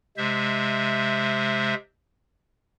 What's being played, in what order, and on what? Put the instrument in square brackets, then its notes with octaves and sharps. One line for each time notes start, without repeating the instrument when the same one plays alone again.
[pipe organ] C3 G#3 C5 E5